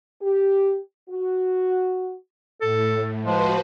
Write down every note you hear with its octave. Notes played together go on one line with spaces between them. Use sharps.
G4
F#4
A2 A4
F3 G#3 F#4 B4 C5